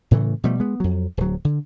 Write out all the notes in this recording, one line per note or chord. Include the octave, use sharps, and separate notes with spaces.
A2 C#3 E3 A3
B2 F3 G3 A3
G#3 B3
F2 F#3
D1 F#3
D3